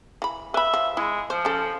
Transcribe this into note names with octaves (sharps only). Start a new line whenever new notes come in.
E3 B5
B4 E5 B5
F3
G#3 E4
F3 C5
C#4 A4